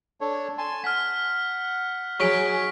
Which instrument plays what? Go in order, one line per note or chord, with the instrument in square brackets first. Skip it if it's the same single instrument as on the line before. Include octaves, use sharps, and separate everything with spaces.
[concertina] D4 A4 C#5
G#5 A5 C6
[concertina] F#5 [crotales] F6 B6
[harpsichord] F#3 D#4 [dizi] G#4 [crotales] C#6 B6 D7